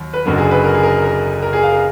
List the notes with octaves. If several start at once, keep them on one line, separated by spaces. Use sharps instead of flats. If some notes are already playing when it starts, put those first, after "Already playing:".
Already playing: D#2 F#3
B4
F#1 F#2 D3 F#3 A#4
G#4
B4
A#4
G#4
A#4
A#4
A#4
G#4
F5
A#4